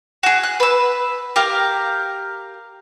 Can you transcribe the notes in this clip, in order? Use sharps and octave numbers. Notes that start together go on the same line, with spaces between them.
F#4 G#4
F#6
B4 E6
G4 A#4 F5